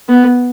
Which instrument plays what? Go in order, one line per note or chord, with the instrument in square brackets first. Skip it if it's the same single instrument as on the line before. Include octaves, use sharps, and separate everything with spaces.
[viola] B3